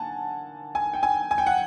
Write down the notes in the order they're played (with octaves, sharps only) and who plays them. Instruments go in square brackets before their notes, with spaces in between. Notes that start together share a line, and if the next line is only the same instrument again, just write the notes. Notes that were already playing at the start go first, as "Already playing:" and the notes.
Already playing: [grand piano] D3 A#3 F#5 G#5 A5
G#5
G5
G#5
G#5
G5
F#5